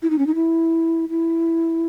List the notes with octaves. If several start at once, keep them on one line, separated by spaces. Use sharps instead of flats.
E4
D#4
C#4
D#4
E4
E4